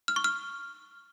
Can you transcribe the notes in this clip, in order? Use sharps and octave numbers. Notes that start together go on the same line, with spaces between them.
F6
C#6
F6